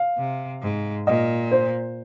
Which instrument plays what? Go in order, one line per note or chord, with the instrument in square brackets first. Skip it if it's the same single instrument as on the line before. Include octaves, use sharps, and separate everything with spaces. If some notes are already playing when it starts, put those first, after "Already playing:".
Already playing: [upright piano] F5
[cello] C3
G#2
[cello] A#2 [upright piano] D#5
[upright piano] C5